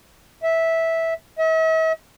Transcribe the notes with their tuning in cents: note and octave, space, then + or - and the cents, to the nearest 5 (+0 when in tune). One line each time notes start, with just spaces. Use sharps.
E5 -10
E5 -45